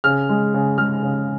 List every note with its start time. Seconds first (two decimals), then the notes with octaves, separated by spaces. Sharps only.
0.04 C#3 F6
0.29 G#3
0.54 C#3
0.78 G#3 F6
1.03 C#3